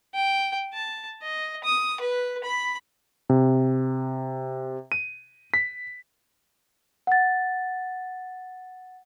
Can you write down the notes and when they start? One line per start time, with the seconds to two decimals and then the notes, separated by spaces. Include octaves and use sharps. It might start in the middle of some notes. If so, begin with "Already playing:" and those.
0.14 G5
0.74 A5
1.22 D#5
1.64 D#6
2.00 B4
2.44 B5
3.30 C3
4.92 D#7
5.54 B6
7.07 F#5 A6